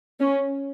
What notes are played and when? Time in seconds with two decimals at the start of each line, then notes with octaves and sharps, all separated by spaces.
0.20 C#4